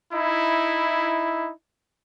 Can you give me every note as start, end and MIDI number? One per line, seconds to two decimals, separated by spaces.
0.13 1.51 63
0.13 1.51 64